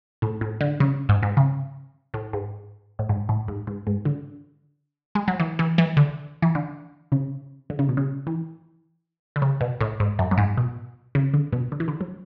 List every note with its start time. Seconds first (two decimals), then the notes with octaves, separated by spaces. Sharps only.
0.22 A2
0.41 A2
0.61 D3
0.80 C#3
1.09 G#2
1.23 G#2
1.37 C#3
2.14 A2
2.33 G#2
2.99 A2
3.09 G#2
3.29 A2
3.48 G#2
3.67 G#2
3.87 G#2
4.05 D3
5.15 G#3
5.28 F#3
5.40 E3
5.59 E3
5.78 E3
5.97 D3
6.42 E3
6.55 D3
7.12 C#3
7.70 D3
7.79 C#3
7.89 B2
7.97 C#3
8.27 E3
9.36 D3
9.42 C#3
9.61 B2
9.81 A2
10.00 G#2
10.19 F#2
10.31 F#2
10.38 G#2
10.57 B2
11.15 C#3
11.34 D3
11.52 B2
11.72 D3
11.80 E3
11.88 D3
12.01 F#3